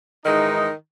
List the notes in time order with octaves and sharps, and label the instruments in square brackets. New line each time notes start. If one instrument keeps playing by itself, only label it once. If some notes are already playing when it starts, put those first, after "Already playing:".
[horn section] G#2 D#3 E3 G#3 D#4